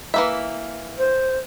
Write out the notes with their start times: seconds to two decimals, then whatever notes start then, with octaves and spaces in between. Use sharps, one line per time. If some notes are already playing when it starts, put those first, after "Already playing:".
0.14 E3 A#3 E5
0.98 C5